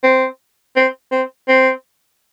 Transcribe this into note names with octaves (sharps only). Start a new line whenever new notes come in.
C4
C4
C4
C4